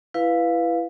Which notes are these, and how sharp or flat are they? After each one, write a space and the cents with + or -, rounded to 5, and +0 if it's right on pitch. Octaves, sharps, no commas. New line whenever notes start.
E4 +20 B4 +0 F5 +0